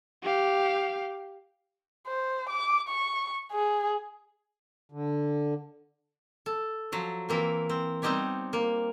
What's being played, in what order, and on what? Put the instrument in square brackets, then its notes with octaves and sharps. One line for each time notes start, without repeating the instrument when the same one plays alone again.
[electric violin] G4 F5
[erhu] C5
D6
C#6
G#4
[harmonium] D3
[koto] A4
F3 F#3
E3 A#3 C4
C4
G3 B3 C4 D#4 G4 C#5
A#3